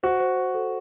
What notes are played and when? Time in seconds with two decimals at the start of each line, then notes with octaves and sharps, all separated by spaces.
0.03 F#4 C5
0.20 C5
0.36 C5
0.54 A4